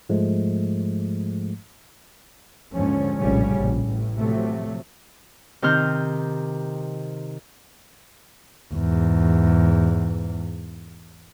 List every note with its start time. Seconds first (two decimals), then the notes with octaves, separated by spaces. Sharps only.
0.09 G#2 F3 G#3 A3
2.74 D#2 G#2 D3 F3 C#4
3.19 F1 A#1 A2 C#3 G3 C#4
3.56 A#1
3.86 A1 A2
4.18 C3 F3 F#3 A3
5.62 C3 D#3 C4 F6 G6
8.73 E2 G#2